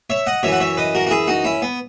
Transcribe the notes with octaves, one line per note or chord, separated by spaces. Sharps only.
C#5 E5
D#5 F#5
F#2 E3 C#5 E5
F#5
C#5 E5
B4 D#5
F#4 A#4
F#4
E4 G#4
D#4 F#4
C#4 E4
B3